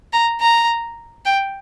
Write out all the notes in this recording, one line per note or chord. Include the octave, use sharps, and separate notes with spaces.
A#5
A#5
G5